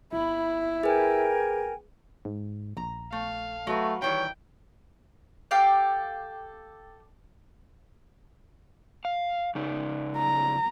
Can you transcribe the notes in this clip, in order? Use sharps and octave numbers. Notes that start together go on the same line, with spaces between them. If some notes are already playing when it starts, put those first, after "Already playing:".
G1 E4 B5
G#4 A#4 B4 G5 G#5
G#2
A#1 A#5
A3 F5
F#3 A3 F#4 B4
D#3 E3 G3 C#5 G5
G4 A4 F5 G5
F5
C#3 D#4
A#5